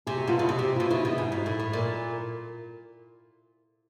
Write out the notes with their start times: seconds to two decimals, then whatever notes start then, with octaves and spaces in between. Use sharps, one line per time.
0.07 C3 G#4
0.17 F#4
0.28 B2 F4
0.38 C#3 E4
0.49 C3 F#4
0.59 C3 G4
0.76 B2 F4
0.90 C#3 E4
1.00 B2 D#4
1.11 E4
1.18 G#2
1.32 G#2
1.46 A2
1.59 A2
1.73 A#2